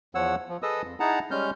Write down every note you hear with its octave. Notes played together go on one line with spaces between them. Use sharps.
E2 F3 C#5 F#5 E6
F3
G#4 A4 B4 D#5 D#6 E6
F2
D#4 E4 G#4 F#5 A5 A#5
G3 G#3 C#4 F6 G6